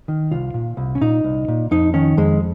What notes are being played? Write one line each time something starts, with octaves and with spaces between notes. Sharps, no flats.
D#3
C2 F4
A#2
C2
C#4
A#2 D#4
C2
A#2
F2 D#4
D#3 C#4
F2 G#3